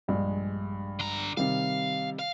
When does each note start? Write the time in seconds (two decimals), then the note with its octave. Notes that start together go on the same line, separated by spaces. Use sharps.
0.08 A#1 G2 G#3
0.99 D3 A#5
1.37 C3 D#3 G3 F5
2.19 F5